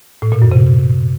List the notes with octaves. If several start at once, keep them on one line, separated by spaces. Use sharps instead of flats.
A2
A#2
F#2
C3